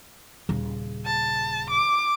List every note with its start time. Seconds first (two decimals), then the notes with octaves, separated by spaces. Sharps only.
0.49 D#1 C#3
1.06 A5
1.70 D6